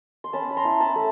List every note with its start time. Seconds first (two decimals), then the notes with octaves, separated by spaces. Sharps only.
0.24 C6
0.33 C#4 A5 B5
0.51 B5
0.57 A#5 C6
0.65 E4
0.80 A5 B5
0.96 A3